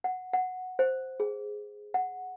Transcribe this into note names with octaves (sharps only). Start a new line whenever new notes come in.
F#5
F#5
C5
G#4
F#5